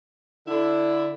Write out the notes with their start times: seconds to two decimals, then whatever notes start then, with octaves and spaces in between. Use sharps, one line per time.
0.47 D3 E4